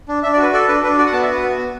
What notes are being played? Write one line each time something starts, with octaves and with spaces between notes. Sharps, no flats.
D4
D4 E5
D5
F#4 B4
A4 D5
D4 B4
D4 B4
F#4 D5
F#5
B3 A5
E5
F#4 B4
B3
B3